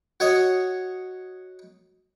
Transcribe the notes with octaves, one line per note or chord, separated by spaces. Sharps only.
F#4 C#5 D#5